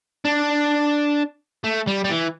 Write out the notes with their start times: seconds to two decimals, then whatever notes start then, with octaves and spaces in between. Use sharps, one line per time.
0.25 D4
1.64 A3
1.87 G3
2.04 G3
2.10 E3